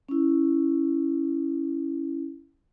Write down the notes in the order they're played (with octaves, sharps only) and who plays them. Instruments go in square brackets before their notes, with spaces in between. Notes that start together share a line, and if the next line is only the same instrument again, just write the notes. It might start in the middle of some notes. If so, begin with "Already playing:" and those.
[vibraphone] C#4 E4